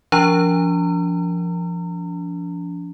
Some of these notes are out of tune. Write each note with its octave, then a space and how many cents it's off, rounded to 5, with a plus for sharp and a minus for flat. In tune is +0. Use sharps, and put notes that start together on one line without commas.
F3 -15 D4 -40 A#5 -35